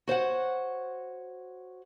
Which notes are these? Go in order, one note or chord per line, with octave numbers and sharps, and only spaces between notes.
F#4 C5 C#5 F#5